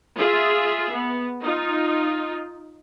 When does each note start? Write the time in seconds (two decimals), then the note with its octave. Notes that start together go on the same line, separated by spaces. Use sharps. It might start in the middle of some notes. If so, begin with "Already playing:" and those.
0.17 F4 G#4 E5
0.90 B3
1.43 D#4 F4